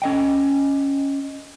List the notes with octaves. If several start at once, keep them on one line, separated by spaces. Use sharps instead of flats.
C#4 D#5 G5